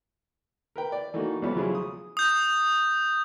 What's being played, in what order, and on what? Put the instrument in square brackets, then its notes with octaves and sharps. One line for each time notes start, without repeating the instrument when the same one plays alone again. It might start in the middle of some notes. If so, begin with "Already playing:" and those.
[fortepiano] A#4 B4 G5
D5
E3 A3 A#3 D#4 F#4
E2 F3 G3 A3 B3 C#4
C#3 F3 F#3 E4 F4 G#4
D#6
[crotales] D#6 G6